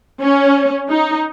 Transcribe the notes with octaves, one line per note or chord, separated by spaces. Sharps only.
C#4
D#4